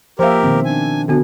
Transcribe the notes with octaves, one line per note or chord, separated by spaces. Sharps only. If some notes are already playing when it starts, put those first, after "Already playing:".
F3 A#3 G4 A#4 C5 E5 F5
B2 D#3 C4
D4 G#5
D3 B3 D4 F#4